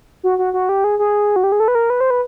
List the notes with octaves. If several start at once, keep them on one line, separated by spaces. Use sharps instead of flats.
F#4
F#4
F#4
G4
G#4
G#4
F#4
G4
G#4
A4
B4
A#4
B4
C5
B4